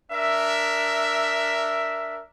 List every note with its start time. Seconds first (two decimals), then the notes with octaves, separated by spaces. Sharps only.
0.12 D4 A#4 E5